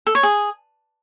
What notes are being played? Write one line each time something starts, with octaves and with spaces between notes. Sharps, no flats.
A4
C#5
G#4